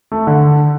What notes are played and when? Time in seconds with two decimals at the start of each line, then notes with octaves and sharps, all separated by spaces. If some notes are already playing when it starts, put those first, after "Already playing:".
0.12 A3
0.27 D3